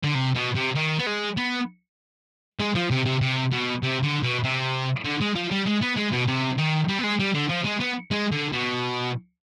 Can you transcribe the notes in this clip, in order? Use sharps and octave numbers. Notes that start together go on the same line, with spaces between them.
D3
C3
B2
C3
D#3
B3
G#3
B3
G#3
F3
C3
C3
C3
B2
C3
D3
B2
C3
D3
G#3
F3
G3
G#3
B3
G#3
B2
C3
D#3
G3
B3
G#3
G3
D3
F3
G#3
B3
G#3
D3
B2